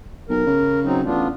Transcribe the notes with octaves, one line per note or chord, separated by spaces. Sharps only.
B1 A#4
C#3
F#3 C4 D#4
A1 B3 D4 F4